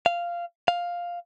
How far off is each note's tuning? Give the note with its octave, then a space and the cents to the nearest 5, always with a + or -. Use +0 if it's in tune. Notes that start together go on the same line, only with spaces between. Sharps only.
F5 -10
F5 +5